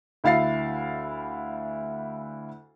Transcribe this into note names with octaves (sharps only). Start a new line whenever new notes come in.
D2 E4 F5 A6 C7